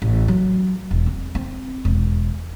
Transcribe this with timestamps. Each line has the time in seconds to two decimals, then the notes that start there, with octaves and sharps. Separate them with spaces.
0.02 A1
0.28 F#3
0.91 E1
1.06 C4
1.35 C4
1.85 E1